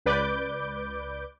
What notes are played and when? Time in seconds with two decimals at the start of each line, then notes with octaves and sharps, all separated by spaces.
0.06 C#2 B4 D5 D6 G6